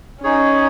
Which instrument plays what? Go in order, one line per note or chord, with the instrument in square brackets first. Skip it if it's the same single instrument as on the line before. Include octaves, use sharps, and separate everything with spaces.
[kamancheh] C#4 [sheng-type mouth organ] D#4 G#4 C#5